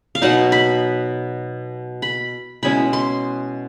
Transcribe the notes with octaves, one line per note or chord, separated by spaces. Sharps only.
F5
B2 F#3 B3 D#4 F#5
B5
B5
B2 G#3 C#4 E4 B5
C6